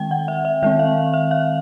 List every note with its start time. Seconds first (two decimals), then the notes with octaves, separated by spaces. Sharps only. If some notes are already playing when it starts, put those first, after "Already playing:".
Already playing: D#3 G#3 C4 G5
0.11 F#5
0.28 E5
0.45 E5
0.63 D#3 G#3 C4 E5
0.79 F5
1.14 E5
1.31 F5